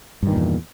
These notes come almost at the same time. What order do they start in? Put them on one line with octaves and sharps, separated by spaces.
G2 D#3 A#2 E2